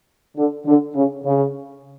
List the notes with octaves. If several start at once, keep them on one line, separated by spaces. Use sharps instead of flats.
D3
D3
C#3
C#3